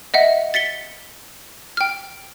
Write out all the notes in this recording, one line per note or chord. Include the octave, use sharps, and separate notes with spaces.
D#5 E5 F#5
A6 B6 C#7 G7
G5 F6